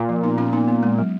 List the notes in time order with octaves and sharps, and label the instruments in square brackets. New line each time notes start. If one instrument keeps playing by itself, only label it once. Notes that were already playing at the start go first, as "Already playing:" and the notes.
Already playing: [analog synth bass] A#2
[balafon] F3
B3 D#4
C#4 F4
B3 D#4
B3
G#3
F#3